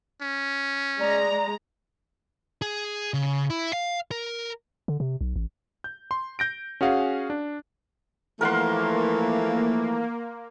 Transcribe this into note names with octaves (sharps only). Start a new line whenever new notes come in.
C#4
G#3 D5 A#5
G#4
C#3
E4
F5
A#4
D3
C3
B1
A1
G6
C6
G6 A#6 D7
C#4 F#4 G#4 F5 F#5
D4
E3 F3 A3 A#3 A#4 F#5 C6